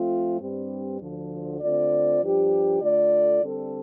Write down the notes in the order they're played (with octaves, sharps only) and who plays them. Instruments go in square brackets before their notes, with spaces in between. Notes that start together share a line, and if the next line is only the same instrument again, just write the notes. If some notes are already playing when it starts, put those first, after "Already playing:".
Already playing: [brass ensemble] F2 F3 A3 C4 F4
G2 G3 C4
D2 D3 F3
D3 A3 C4 F4 D5
G2 F3 D4 G4
D3 A3 F4 D5
D3 G3 C4 A4